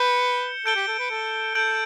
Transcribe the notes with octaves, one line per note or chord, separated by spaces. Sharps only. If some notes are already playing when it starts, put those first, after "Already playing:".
Already playing: B4 G6 C#7 E7 G7
A4 G6 D7 G7
G4
A4
B4
A4
A4 G6 D7 F#7